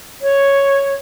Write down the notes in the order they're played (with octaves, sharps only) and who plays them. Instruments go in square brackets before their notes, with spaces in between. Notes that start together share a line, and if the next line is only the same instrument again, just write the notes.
[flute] C#5